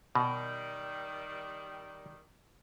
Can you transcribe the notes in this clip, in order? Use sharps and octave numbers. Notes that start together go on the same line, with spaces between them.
B2 D#3 G3